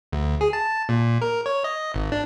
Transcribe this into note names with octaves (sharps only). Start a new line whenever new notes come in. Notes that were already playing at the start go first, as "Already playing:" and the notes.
D2
G#4
A5
A#2
A#4
C#5
D#5
G#1
D4